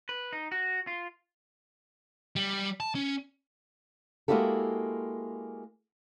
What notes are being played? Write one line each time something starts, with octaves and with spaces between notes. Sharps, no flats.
B4
D#4
F#4
F4
G3
A5
C#4
G#3 A#3 E4 F#4 G4 A4